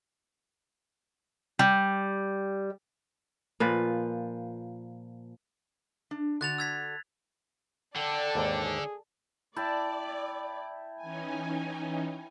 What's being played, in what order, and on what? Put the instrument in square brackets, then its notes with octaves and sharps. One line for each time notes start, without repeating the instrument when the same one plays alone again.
[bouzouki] G3
[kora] A#2 F3 B4
[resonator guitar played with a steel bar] D4
[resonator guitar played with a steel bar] D3 F#4 A5 [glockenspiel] F#6 A6 F7
[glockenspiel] E6 G#6 B6
[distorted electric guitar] D3 [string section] A4 D5 [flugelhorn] G5
[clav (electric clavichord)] D#2 G#2
[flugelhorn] G#4
[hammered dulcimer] E4 G5 A5 [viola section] D5
[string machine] E3 C#4 D#4 [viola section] G#5